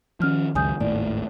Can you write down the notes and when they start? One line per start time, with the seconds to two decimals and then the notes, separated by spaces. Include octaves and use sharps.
0.20 D#3 F3 C#4 F6
0.55 C#2 F#2 G#3 G#5 D#6 G6
0.80 G#1 D#2 A2 D5